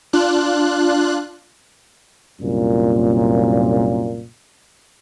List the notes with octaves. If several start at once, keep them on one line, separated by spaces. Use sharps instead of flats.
D4 F4 F#6
C2 F#2 A#2